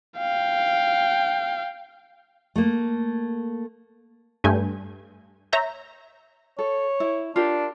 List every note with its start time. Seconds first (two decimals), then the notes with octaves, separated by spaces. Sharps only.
0.18 F5 G5
2.56 A3 A#3
4.44 G2 A3 G#5 G6
5.53 C#5 E5 A#5 G6
6.59 A4 C#5
7.00 E4
7.36 D4 F4 G4 A#4